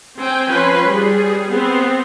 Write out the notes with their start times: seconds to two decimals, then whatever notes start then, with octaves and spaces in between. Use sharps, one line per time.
0.19 C4 G5 G#5
0.49 F3 C#4 B4 G#5 B5 C6
0.89 G3 G#4
1.52 B3 C4